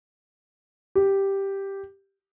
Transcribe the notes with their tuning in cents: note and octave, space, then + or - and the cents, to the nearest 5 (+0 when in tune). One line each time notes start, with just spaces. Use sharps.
G4 +0